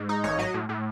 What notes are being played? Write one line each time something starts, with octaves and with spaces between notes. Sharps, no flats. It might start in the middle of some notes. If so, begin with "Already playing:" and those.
Already playing: G#2
D#4
A1 C#5
F#3 D#5
A2
A2